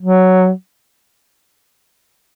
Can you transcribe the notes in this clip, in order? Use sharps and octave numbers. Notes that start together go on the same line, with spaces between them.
F#3